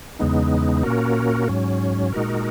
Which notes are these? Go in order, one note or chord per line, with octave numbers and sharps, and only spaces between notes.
E2 C#3 G#3 B3 D#4
A#2 A#3 C#4 F#4 A#4
G#2 F#3 C#4
A#2 G#3 D#4 F#4 A#4